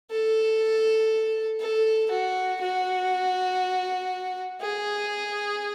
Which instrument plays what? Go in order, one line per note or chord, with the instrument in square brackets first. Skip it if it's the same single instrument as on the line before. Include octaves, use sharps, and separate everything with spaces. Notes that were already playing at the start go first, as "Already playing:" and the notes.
[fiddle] A4
A4
F#4
F#4
G#4